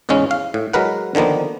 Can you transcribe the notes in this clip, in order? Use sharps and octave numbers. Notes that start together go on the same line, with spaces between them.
E2 G#2 C#3 G#3 C#4
F5
A2
F#3 G#3 A#4 B4 F#5
D3 D#3 F3 A#3 B3